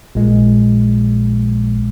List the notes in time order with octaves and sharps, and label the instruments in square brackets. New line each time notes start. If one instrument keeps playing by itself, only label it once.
[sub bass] A#1 [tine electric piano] A#2 G#3